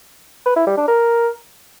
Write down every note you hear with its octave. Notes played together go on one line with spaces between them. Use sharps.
B4
E4
G3
D4
A#4